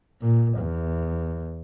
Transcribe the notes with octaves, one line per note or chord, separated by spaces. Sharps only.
A#2
E2